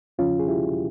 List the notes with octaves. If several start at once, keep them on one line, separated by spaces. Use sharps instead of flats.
E2 C#3 F3 C#4 F4
G#4
E4 G4